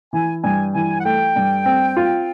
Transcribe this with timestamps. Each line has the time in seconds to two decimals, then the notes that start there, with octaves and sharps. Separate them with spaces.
0.13 E3 G#5
0.44 G2 G#5
0.74 E3 G#5
0.99 F#5
1.05 A3 G5
1.36 G2
1.66 C4
1.97 F4